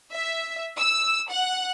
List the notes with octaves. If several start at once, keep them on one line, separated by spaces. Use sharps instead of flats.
E5
E6
F#5